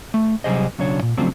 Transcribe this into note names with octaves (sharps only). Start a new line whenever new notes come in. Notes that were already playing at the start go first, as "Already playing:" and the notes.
A3
C3 F#3 G3 G#4 C5 D#5
B1 C#3 F#3 D4 C#5
A#2
C#3 F3 F#3 A3 C4 D4